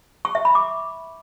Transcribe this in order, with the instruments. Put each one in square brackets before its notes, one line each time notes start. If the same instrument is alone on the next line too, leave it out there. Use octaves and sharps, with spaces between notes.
[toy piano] C#6
E5
B5
D6